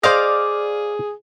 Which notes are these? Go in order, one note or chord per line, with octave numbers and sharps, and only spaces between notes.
G#4 C5 D5 D#5 F5 D6